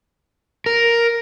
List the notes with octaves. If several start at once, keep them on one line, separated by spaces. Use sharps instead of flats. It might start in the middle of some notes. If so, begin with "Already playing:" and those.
A#4